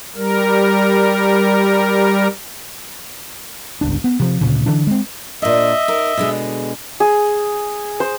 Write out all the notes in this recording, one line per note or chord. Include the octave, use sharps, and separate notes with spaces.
G3 A#4
G1 C#2 D4
B3
C3 F3
D2 A#2 C#3
D3 E3 D4
G#3 C4
A#2 D4 D#5 E5
D#4 A#4
B2 D3 G#3
G#4
C5